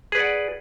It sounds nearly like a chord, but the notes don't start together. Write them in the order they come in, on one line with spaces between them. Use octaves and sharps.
G#4 B4 D5 F#5